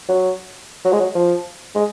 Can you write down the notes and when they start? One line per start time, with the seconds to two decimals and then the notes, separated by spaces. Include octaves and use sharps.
0.09 F#3
0.85 F#3
0.93 G#3
1.00 F#3
1.15 F3
1.75 G#3